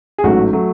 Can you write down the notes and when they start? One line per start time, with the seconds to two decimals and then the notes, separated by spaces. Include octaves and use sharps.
0.18 G#4
0.23 A1 G#2 F#3 A3 F#4
0.53 F#3 A3